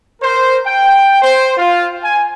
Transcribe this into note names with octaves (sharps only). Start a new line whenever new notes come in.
A#4 C5
G5
C5
F4
G#5